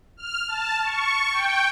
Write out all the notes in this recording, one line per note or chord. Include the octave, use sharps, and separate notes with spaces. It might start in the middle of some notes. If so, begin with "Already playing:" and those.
F6
A5
C#6
G5